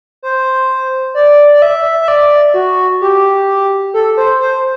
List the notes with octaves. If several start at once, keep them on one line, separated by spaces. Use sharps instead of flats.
C5
D5
D5
E5
E5
D5
F#4
G4
A4
C5
C5